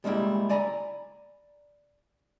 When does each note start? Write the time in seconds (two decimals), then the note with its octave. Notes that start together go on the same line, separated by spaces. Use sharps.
0.04 G3 G#3 A#3 D#4 E4 G4
0.50 D5 G#5 A#5 B5